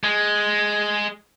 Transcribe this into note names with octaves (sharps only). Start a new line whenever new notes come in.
G#3